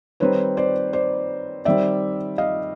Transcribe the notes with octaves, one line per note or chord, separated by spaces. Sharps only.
D#3 G3 C4 D#4 B4 C#5
C5 D5
C5 D5
D#3 G3 C4 D5 E5
D#5 F5